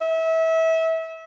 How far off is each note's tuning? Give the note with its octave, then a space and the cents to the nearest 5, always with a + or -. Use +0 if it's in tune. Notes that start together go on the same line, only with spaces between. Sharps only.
E5 -30